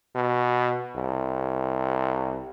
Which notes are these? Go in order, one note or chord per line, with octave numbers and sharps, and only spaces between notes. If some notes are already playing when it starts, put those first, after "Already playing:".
B2
C2